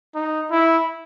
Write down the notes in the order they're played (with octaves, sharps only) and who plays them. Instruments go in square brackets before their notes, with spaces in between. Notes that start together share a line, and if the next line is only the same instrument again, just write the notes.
[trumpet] D#4
E4